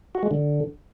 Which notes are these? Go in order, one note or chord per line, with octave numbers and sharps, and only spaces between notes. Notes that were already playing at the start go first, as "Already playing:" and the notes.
F#4
G#3
D3